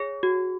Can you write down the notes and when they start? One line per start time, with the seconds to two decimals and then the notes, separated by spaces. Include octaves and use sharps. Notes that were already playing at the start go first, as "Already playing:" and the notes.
Already playing: G#4 C#5
0.23 F#4